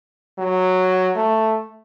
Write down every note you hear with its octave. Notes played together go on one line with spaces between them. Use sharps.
F#3
A3